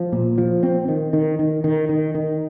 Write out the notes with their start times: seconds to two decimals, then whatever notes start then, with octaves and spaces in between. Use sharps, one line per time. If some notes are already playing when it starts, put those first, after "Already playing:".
Already playing: F3
0.12 A#2
0.38 F3
0.63 C4
0.88 D#3
1.13 D#3
1.39 D#3
1.64 D#3
1.89 D#3
2.15 D#3